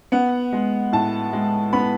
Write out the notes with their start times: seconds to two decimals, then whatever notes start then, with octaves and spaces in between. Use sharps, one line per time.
0.12 B3 F#5
0.53 G#3
0.92 A2 A5
1.33 G#3
1.73 B3 B5